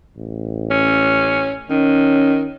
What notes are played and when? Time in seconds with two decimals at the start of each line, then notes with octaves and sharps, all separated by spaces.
0.17 A1
0.71 C#4
1.70 D#3 C#4